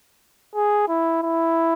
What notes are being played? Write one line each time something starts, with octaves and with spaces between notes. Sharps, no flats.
G#4
E4
E4